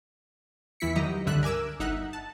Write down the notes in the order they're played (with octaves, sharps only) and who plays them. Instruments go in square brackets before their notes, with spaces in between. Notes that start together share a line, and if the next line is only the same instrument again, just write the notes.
[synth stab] E2 E3 E4 B6 C#7
D#3 F#3 G4 D#5 A#5
C#2 G2 D3 E5 F#6
A#4 G#5 D6 E6
G1 D#4 E5 F#5 F#6
A5